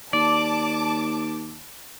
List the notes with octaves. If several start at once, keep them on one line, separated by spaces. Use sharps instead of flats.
D#2 D5 A5 D6